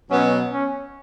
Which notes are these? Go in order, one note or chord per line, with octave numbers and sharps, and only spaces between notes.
B2 F#3 B3 C#4
C#4